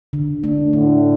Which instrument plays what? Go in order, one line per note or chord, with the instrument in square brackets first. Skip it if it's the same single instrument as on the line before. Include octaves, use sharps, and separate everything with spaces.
[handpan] D3
A3 D4
[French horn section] A2 D3 [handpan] A3